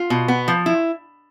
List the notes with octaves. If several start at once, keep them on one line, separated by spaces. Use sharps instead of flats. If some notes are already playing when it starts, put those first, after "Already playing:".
Already playing: F4
B2
B3
F3
E4